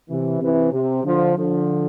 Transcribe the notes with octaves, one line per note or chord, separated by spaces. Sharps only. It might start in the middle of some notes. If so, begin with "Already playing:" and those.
C3 E3
C3 E3
C3
D3 F3
D3 F3